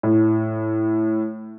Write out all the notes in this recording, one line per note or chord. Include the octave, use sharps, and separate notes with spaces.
A2